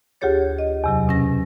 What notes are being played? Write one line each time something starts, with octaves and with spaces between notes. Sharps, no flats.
D2 F4 G4 G#4 C#5 A6
D#5
E2 C3 F#3
B2 C#4 A#6